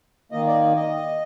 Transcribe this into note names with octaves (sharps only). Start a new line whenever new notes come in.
D#3 A#3 D#5
D5
D#5